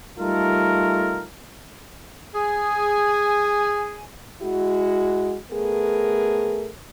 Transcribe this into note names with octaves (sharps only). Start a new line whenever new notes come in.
G3 A3 D#4 F4 A4 A#4
G#4 G#5
G#3 E4 F#4
A3 B3 G#4 A#4